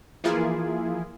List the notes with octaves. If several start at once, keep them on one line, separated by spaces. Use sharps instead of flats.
E3 F3 A#3 E4 F4 G#4